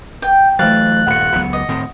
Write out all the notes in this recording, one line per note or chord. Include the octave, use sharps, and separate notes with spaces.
G5
E3 F#3 A3 C5 F5 F#6 A6
D#1 G2 F#5 C#7
C#2 F#3 B3
D#5
A2 D#3 C4